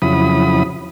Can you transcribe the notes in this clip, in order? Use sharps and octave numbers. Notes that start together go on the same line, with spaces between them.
F2 C#3 F#3 E4 B5 D#6